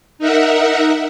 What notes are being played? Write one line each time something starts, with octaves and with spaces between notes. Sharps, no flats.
D#4 A#4 E5 F#5